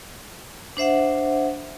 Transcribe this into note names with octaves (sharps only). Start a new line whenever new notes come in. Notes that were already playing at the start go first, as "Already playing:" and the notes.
D4 C5 E5 F#5